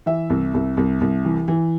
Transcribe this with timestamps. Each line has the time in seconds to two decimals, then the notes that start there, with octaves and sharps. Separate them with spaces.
0.06 E3 E5
0.30 C2
0.54 C2
0.77 C2
1.01 C2
1.25 E3
1.48 E3